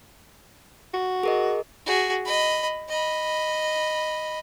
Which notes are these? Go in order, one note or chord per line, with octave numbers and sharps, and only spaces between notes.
F#4
G#4 A#4 D#5
F#4 G#4
D#5 B5
D#5 B5